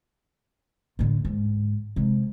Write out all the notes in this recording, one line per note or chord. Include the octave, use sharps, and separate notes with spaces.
A2 D3
G#2
C3 G#3